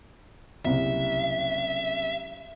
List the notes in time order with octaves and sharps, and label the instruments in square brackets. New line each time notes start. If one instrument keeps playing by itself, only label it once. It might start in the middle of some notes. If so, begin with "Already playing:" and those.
[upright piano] F#1 C2 [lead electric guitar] E5